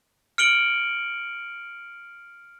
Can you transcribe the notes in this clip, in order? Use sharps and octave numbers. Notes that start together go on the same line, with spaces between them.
F6 C#7 D7 F#7 G7